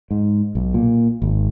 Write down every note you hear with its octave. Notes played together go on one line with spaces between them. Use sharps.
G#2
B1
A#2
G#1